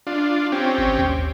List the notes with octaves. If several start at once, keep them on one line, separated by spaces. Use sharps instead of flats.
D4 F4
C4 C#4 G4
G#1
D#2